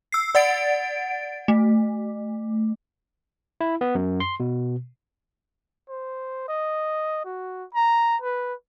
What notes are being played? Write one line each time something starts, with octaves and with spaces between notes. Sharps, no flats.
E6 C7
D5 F#5 A6 D7
A3
E4
B3
F#2
C6
B2
C5
D#5
F#4
A#5
B4